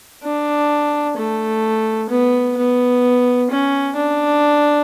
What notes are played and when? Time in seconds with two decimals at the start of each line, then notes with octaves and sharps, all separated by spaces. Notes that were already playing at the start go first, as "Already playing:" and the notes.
0.23 D4
1.16 A3
2.09 B3
2.57 B3
3.50 C#4
3.96 D4